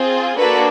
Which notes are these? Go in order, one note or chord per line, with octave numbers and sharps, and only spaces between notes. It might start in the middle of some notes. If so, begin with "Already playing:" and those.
Already playing: C4 F4 G#4
A#3 D4 F#4 A4 B4